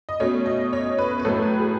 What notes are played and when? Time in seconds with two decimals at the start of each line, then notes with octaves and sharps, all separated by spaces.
0.09 D#5
0.20 B2 A3 C#4 C#5
0.46 D#5
0.73 C#5
0.98 B4
1.19 B4
1.25 A2 F#3 A3 A4
1.42 B4
1.60 G#4